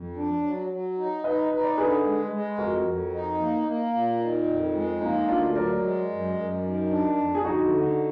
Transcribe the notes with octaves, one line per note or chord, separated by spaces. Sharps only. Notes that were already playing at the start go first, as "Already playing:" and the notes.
Already playing: F2
D4
F#3
F#3
D#4
D#4 B4 D#5
D#4 B4
D5
D3 G#4 B4
G#3
G#3
F2 F#4 A#4
F2
D#4
A#3
A#3
A#2
D#3
F2
G#3
A#3 D#4
D2 D4 F4
F#3 A#4 D5
G#3
F#2
F#2
D#3
D4
F2
G#4
D2 D#4 F#4
D3